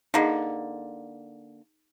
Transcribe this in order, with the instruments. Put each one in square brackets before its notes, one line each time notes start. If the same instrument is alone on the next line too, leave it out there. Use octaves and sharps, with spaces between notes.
[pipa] D3 A#3 [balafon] D#4 G#4 D#5